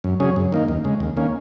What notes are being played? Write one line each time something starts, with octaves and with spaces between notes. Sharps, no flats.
F#2
C#3 F#3 C#4 G#4
F#2
D#3 A#3 D#4
D#2
C#3 G#3
D#2
D#3 A#3 C#4